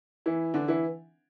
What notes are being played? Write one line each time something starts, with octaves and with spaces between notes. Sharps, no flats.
E3 E4
D3 D4
E3 E4